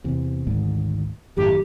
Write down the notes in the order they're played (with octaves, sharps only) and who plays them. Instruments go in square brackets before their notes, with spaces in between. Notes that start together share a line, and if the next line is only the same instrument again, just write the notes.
[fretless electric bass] E2 C3
G#1 D2 G#2
[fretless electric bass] G#1 F#2 A2 [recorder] G4